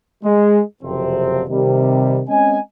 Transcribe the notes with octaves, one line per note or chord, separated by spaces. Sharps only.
G#3
F#1 F2 C3 C4
C3 D#3 G3
G#3 C4 C#4 D#5 G#5